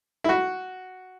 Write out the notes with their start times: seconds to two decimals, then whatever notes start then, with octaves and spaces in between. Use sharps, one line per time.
0.24 E4
0.29 F#4